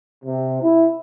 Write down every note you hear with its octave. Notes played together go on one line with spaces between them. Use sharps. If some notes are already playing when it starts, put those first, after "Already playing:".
C3
E4